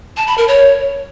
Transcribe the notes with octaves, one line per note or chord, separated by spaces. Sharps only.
A5
B5
A#4
C#5